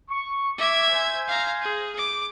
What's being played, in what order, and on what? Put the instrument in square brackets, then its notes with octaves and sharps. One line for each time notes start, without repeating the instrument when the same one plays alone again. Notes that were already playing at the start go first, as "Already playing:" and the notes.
[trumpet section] C#6
[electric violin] E5 G#6 [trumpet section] D6
[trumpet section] C5 G#5
[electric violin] F5 A#5
G#4
D6